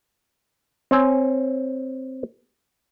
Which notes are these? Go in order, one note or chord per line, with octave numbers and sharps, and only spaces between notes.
C4 C#5 G#5